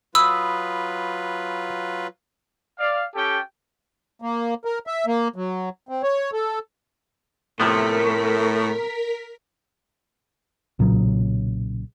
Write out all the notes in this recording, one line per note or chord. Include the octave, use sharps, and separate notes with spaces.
F#3 F4 B4 B5 D#6 E6
D5 F5
C#4 G4 A4 G5
A#3
A#4
E5
A#3
F#3
C4
C#5
A4
A2 C3 F3 A3 B3 A#4 B6
B1 A#2 C#3 F#3